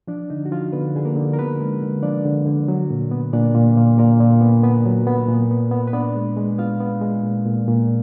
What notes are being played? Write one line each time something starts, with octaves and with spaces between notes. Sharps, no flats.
F3 D4
D3 D#4
F#4
F3 F4
D3 B3 B4
D3 G#4
A#3 A#4
D3
A#4
D3 B3 B4
G#3
D3
F3 D4 D5
D3
D3
F#3
A#2
B3
A#2 D4 D5
A#2
A#2
A#2 A#3 A#4
A#2
B3
B3 B4
F#3
B3
A#2
B3
B3
B4
B3 D4 D5
G#3
G#3
B3 F4 F5
B3
G#3
A#2
A#2
A#2